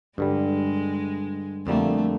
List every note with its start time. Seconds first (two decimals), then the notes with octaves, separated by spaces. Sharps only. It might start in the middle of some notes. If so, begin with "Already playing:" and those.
0.18 G2 D3 G3 G#3
1.66 F2 D3 G3 A3 A#3